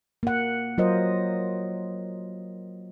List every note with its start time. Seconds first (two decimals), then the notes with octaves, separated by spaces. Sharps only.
0.23 A#3 F#5
0.78 F#3 F4 A#4 C5 D#5